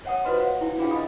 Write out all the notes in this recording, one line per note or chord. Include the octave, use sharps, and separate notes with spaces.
C#5 E5 F#5 G5 A5 D#6
F4 F#4 B4 C5 D#5 C6
C#5 F5 F#5
E4 G5
D4 F4 G#4 E5 F5 G5
D#5 F5 G#5 B5 D#6